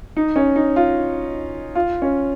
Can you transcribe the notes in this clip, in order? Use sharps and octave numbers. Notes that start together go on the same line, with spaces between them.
D#4
C#4
D#4
F4
F4
C#4